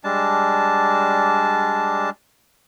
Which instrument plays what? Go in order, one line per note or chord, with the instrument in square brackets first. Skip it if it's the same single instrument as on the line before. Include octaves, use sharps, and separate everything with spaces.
[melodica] G3 G#3 D4 A5